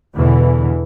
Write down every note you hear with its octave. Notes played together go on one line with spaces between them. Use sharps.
E2 B2 D3 E3